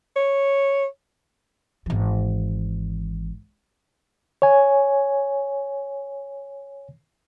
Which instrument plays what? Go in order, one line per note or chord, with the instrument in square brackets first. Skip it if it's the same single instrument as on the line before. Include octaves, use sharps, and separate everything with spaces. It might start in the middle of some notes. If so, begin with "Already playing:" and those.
[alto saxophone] C#5
[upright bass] G#1 E3
[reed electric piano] C#5 G#5